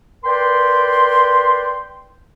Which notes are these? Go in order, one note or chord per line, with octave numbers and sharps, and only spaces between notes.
A#4 B4 D5 G5 C6